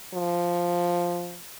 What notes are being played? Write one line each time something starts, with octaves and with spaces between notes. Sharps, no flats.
F3